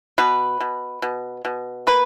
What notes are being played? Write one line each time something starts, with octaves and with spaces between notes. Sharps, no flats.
B2 B4
B2
B2
B2
A#3 B4